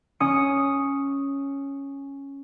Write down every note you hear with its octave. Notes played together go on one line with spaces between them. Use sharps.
C#4 D#6 C#7